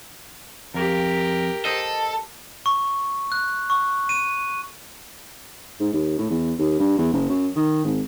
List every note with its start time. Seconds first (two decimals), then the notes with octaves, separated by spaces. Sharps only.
0.74 F2 G4 A#4
1.65 A4 C5 D#5
2.66 C#6
3.32 F#6
3.70 C#6
4.09 D#7
5.80 G#2
5.93 D#2
6.18 A2
6.30 E2
6.59 D#2
6.79 G2
6.98 E2
7.13 F#1
7.29 F#2
7.56 D#3
7.85 G#1